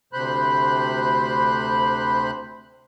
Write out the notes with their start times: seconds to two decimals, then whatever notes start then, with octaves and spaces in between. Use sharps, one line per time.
0.13 D2 C3 C5 B5 F#6